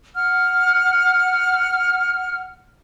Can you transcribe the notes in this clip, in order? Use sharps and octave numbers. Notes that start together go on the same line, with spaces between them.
F#5 F6